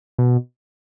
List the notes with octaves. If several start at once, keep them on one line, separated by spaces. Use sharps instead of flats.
B2